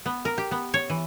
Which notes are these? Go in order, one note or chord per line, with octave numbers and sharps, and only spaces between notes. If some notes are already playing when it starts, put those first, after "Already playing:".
B3
A#4
G4
B3
C#5
E3